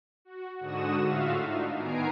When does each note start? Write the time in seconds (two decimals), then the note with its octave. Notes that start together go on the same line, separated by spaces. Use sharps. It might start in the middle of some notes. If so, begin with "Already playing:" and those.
0.25 F#4
0.59 G#2 D3 F#4 D#6 E7
1.03 A2 F4 F#4 E5 F5
1.43 D4 D#4
1.76 D#3 B3 G#5 A#5 C7 D7